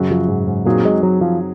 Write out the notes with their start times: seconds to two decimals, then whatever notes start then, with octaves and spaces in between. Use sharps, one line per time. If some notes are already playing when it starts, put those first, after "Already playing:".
Already playing: F#2 C#3 F#3 C#4 F#4
0.11 F3
0.28 G#2
0.47 G#2
0.65 A#2 F#3 C4 D#4 G#4
0.85 G#3
1.03 F#3
1.21 F3